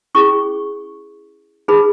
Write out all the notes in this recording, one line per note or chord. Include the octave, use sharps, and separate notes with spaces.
C#4 E4 G#4 C#6
D#4 G#4 B4 B5